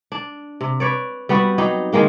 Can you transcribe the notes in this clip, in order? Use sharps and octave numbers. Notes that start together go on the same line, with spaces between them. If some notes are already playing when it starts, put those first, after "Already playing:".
D4
C3
B4 C#5 D5
G3 B3 C4 F#4
F#3 D#4 G4
D#3 G#3 A#3 G4